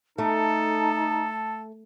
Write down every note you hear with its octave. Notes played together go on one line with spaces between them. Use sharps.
A3 D#4 A4 A5